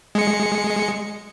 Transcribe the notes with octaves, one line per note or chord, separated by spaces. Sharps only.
G#3 C#7